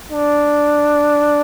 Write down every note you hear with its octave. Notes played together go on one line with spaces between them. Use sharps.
D4